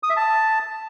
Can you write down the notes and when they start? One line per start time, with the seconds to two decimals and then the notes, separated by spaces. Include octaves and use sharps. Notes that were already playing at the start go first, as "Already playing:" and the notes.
0.03 D#6
0.10 E5
0.16 A5